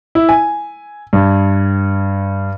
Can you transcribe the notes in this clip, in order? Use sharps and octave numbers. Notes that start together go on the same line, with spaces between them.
E4
G#5
G2